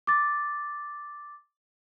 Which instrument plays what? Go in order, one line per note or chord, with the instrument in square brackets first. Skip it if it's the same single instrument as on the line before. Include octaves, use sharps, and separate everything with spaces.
[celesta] D6 A6